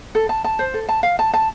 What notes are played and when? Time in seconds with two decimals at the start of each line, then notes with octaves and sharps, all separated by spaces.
0.15 A4
0.29 A5
0.44 A5
0.59 C5
0.74 A4
0.89 A5
1.03 F5
1.19 A5
1.34 A5